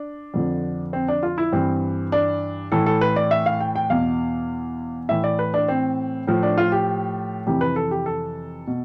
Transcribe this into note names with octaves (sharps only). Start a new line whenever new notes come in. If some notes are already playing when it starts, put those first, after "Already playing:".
Already playing: D4
F2 D3 F3
C4
D4
F4
E4
G2 E3 C4
D4
A2 E3 A4
A4
B4
D5
E5
F5
G5
G5
E2 B2 F5
A2 E3 E5
D5
B4
D4
C4
A2 F3
D4
F4
G4
F2 C3 E3 G4
B4
A4
G4
A4
B2